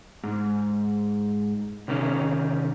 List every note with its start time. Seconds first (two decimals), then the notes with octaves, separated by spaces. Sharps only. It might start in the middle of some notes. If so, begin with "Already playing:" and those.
0.24 G#2
1.88 C3 D#3 C#4